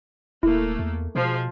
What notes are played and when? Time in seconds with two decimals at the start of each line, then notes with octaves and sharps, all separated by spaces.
0.43 D#1 A3 A#3 E4
0.79 E2
1.15 B2 F3 G#3